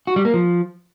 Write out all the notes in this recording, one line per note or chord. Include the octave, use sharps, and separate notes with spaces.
F#4
G3
A#3
F3